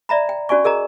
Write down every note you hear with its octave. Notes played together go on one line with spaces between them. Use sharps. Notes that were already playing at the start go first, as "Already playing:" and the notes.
D5 E5 A#5 B5
G5
C#4 F#4 D5 G#5 C#6
G#4 A#4 D#5 A#5